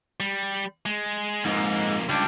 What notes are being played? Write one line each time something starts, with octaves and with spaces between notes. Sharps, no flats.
G3
G#3
F2 G#2 A#3
C#2 G3 D4